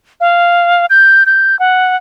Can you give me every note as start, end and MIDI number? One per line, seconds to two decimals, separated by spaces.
0.20 0.86 77
0.90 1.26 91
1.26 1.58 91
1.59 1.96 78